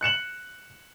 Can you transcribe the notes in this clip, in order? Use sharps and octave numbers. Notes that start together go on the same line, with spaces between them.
F#6 C#7 E7 F#7